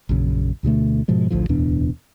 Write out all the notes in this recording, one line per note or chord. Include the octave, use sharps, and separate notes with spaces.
A#1 F#2 C#3
D2 B2 D3 A3
G#2 B2 F3 G#3
A1 D2 A2 F3
D1 E2 B2 D4